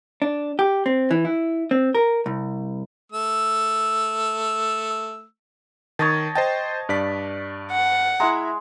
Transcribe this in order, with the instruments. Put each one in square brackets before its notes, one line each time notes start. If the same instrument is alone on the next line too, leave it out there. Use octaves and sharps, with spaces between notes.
[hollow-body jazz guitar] D4
G4
C4
E3
E4
C4
A#4
C2
[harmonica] A3 E6
[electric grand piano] D#3 [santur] C#5 D#5 A5
[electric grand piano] C5 D#5 G5 [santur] A5
[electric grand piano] G2 D5 B6
[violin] F#5
[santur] G#3 [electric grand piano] E4 E5 A#5